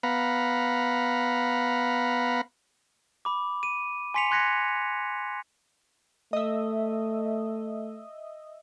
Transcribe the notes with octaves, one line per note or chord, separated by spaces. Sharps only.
B3 F5 F#5 A#5 B5
B5 D6
D#7
G#5 C6 B6 C#7 F7
C6 F#6 G#6 A#6 B6 C#7
A3 D#5 E5